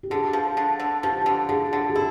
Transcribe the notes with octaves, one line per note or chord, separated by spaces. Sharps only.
G4
D3 G#4
F3
D3
D3
F3 G4
D3
D3 G#4
D3
G#4
E4 G4